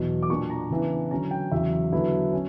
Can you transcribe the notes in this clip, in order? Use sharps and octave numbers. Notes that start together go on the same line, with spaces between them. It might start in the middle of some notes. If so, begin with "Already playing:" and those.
Already playing: E2 B2 F#3
D6
A#2 A#3 D4 C#6
A#5
C#3 E3 B3 D4
D3 F#3 C#4 A#5
G5
E2 C#3 F#3 E5
D3 F#3 B3 E4
C#4